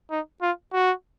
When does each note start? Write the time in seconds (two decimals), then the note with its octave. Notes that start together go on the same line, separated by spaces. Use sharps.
0.10 D#4
0.42 F4
0.73 F#4